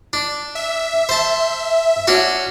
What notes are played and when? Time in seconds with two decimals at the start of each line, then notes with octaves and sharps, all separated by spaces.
0.13 D4
0.55 E5
1.09 C5 A5
2.07 C#4 D4 F#4